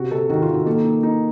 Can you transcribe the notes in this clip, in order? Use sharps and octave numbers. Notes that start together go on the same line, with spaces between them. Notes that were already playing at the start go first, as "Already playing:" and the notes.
Already playing: C3 F#4
C3 A4
D#3 F#4
F4
D#3
F#4
A#3 A4
D#4
D#4